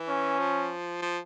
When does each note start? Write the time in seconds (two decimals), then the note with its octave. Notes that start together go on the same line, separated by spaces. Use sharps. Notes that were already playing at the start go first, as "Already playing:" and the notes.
Already playing: E3
0.08 C#4
0.40 F3
1.02 F3